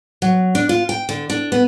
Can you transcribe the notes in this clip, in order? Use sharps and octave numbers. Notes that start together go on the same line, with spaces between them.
F#3
D4
F4
G5
D3
D4
B3